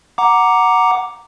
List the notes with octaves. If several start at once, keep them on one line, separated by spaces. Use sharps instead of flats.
F#5 A#5 D6